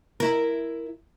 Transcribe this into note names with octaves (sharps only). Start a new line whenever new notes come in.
E4 A#4